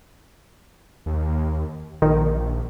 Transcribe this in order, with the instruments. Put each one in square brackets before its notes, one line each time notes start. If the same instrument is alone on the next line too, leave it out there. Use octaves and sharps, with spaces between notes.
[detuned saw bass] D#2
[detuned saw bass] A#1 [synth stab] D#3